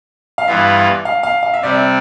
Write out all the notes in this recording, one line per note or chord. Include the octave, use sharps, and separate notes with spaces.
F5
G2 E3 B3 F4 E5
F5
F5
F5
E5
C3 G3 C4 D5
E5